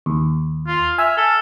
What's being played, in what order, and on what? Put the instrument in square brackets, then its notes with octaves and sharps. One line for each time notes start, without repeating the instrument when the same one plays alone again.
[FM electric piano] D#2
[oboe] F4
[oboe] E5 [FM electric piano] G#5 F6
[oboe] A4